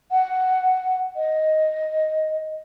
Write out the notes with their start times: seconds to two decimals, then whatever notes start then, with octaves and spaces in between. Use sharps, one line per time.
0.12 F#5
1.17 D#5